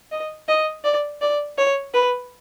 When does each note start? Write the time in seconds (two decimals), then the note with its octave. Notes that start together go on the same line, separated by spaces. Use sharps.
0.12 D#5
0.48 D#5
0.84 D5
1.21 D5
1.58 C#5
1.94 B4